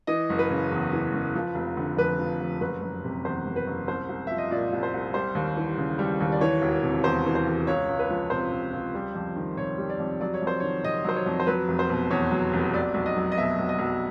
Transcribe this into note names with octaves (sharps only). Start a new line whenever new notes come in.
E3 D#5
F#1
B4
C#3
E2
E3
F#1
F3
F1
D3
F2 B4
F3
F1
F#1 B4
F#1
C3
E2 C5
F#1
B4
F#1
C2 C5
C2
F3 E5
D#5
A#2 D5
C2
C5
C2
G3 C5
D#2
E3
C#3
G3
D#2
D5
E3 C#5
E1
C3
E2 C5
E3
C5
E1
C#2 C#5
C#2
B4
F3
C3 C5
C#2
C#2
G3
F2
D#3
C3 C#5
G3
D5
F2
F#3 D5
C#5
F2
C5
D#3 C#5
C3 D#5
F#3 C5
C#5
F2
C5
F#3 B4
F1
C5
B2
E2 C#5
F#3
F1
B1 D5
B1
D#5
F#3
D#5
B2 E5
B1
D#5
B1